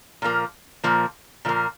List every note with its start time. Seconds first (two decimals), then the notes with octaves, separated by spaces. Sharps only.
0.22 A#2 F3 A#3
0.84 A#2 F3 A#3
1.45 A#2 F3 A#3